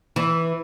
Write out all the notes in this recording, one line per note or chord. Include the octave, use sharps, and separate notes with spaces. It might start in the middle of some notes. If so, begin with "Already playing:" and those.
E3